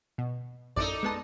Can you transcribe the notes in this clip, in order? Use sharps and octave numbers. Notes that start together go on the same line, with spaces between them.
B2
A1 F#2 D#4 A4 D5
G#3 B3 A5